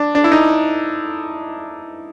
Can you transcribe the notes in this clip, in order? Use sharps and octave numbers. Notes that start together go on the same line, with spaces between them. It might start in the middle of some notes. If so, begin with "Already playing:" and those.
Already playing: D4
D4
E4
D#4